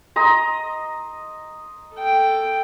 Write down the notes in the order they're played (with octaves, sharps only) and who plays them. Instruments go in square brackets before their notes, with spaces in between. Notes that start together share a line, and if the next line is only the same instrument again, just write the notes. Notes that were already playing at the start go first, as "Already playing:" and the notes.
[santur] D#5 A#5 C6
[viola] A4 G5